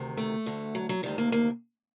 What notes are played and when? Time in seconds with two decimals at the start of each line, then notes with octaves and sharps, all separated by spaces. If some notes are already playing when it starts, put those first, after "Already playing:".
Already playing: D2 C3 D#3
0.17 A3
0.46 D2 D3
0.75 F#3
0.89 F#3
1.03 D2 C3 D#3 G3
1.18 A#3
1.32 A#3